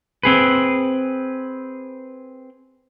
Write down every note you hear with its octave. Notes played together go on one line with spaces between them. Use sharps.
C4 G#4 B4